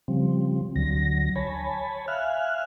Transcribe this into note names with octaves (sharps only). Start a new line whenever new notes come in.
C#3 F3 G3 C4
D2 D3 F#3 A#6
C#5 G#5 A5 B5
E5 F5 G#5 F6 F#6